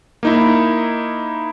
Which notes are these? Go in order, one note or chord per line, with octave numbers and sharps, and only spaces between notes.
A#3 D#4 E4